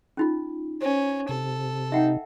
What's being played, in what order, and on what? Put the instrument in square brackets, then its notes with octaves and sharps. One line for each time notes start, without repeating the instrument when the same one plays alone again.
[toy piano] C#4 D#4 F4
[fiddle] C#4 [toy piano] C5
[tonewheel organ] C3 [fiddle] A4
[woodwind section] D#4 [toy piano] E5 F#5 G5